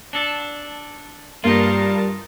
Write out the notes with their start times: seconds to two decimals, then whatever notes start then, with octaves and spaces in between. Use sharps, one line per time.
0.13 D4 A4
1.44 G2 G3 A#3 D#4 F4 A#4 A5